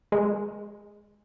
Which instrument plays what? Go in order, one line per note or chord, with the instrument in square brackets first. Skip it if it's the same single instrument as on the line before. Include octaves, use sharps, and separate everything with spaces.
[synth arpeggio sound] G#3